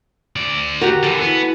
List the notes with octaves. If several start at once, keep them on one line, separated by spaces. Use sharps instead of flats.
D2 D5
F#4 G4 A#4 A#5
D3 E3 A4 F#5 G#5
E3 B3